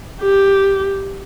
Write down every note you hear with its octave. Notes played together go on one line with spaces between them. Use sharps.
G4